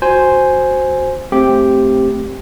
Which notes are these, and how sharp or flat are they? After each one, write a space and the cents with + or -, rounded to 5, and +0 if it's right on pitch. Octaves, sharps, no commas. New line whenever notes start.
F#4 +0 C5 +0 G#5 +0
A3 +0 C4 +5 G4 +0